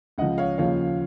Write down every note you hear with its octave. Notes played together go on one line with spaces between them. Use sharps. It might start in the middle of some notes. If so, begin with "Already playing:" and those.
C#2 C#3 F3 D#5 F#5
C#5 F5
D#2 C#3 F3 C#5 F5